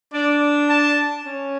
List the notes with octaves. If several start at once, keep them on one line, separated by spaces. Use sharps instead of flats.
D4 D5
A5
C#4